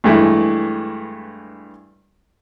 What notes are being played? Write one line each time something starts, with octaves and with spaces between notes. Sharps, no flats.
G2 E3 G#3 A3 E4